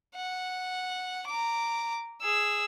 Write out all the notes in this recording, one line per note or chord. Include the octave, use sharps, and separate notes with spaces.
F#5
A#5 D6
G#4 E6